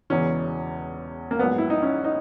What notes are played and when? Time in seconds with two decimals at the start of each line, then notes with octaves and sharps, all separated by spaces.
0.10 E1 E2 C#3 E3 C#4
1.31 A#3
1.39 A#1 G#2 F#3 B3
1.58 E4
1.70 D#4
1.82 C#4
2.04 D#4